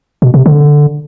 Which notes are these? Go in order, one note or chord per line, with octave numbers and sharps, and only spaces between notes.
B2
C3
D3